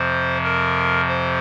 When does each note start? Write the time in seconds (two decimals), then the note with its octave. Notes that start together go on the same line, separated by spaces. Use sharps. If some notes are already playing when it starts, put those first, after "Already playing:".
Already playing: F2 C3 F3 C5
0.44 A#4
1.08 C5